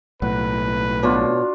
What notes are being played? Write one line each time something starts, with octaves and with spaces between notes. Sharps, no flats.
B1 A2 B4 F#5
B2 D4 F4 F#4 C#5